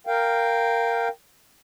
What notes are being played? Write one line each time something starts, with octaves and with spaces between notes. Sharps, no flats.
A#4 F5 G5